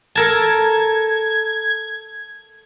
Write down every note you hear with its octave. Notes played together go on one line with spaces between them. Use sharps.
A4 A#4 A5 G#6